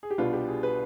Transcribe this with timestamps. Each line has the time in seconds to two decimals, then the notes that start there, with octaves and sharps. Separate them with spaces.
0.03 G#4
0.10 G4
0.18 C2 B2 B3 D4 F4
0.33 G4
0.48 G#4
0.63 B4